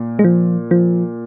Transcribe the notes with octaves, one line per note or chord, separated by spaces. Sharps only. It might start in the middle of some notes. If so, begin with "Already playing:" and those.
Already playing: A#2
G#3
F3
F3